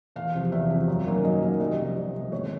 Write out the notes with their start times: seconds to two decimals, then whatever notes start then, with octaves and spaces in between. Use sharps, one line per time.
0.16 E2 F5
0.34 C3 F3
0.52 E2 E5
0.70 C3 F3
0.88 F#2
1.06 D#3 F#3 A#3 C#4
1.23 F#2 D#5
1.42 D#3 F#3 A#3 C#4
1.60 C2 D#5
1.78 C3 F3
1.96 C2
2.14 C3 F3
2.32 G#1 C#5